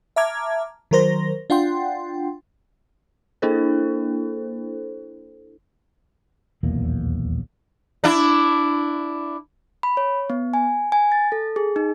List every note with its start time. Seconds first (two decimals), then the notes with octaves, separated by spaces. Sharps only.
0.16 E5 A5 A#5 D6 F6 G#6
0.91 D#3 F#3 A#4 C5 A#6
1.50 D4 F4 F#5 G5 C6
3.42 A#3 D4 E4 A4 C5
6.63 D#1 B1 E2 A#3
8.04 D4 E4
9.83 B5
9.97 C#5
10.30 B3
10.54 G#5
10.92 G#5
11.12 A6
11.32 A4
11.56 G#4
11.76 D#4